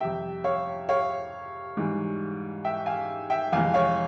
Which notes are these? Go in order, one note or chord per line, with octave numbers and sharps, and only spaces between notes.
F2 C3 G3 E5 G5
C#5 F5
C#5 F5
G#2 E3 G3
E5 G5
F5 G#5
E5 G5
F2 C3 E3 G#3 F5 G#5
C#5 F5